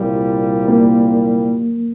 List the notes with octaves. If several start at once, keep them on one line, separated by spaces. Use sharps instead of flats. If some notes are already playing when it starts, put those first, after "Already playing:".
Already playing: C2 A#2 G3
A#3